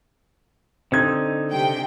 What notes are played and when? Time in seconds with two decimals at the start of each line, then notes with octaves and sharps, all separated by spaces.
0.92 D3 C4 D#4 G#6
1.51 C3 G5